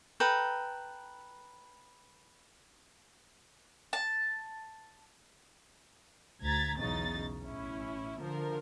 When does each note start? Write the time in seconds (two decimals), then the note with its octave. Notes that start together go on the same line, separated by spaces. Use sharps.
0.20 A4 B4 G5 A#5
3.93 A5
6.42 D2 A#5 G#6 A6 B6
6.78 B1 E2 C#3 D#4 A6
7.42 A1 C#4 E4
8.21 D3 F3 A#4